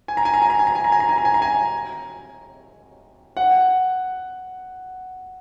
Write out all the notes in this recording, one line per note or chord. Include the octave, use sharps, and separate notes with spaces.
G#5
A#5
G#5
A#5
G#5
A#5
G#5
A#5
G#5
A#5
G#5
A#5
G#5
A#5
G#5
A#5
G#5
F#5